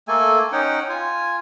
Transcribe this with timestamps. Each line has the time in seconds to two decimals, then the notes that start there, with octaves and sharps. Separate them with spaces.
0.08 A3 A#3 A4 G#5
0.52 C#4 D#4 F#5 G5
0.89 F4 G#5